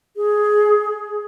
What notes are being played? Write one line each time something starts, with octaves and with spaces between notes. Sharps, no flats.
G#4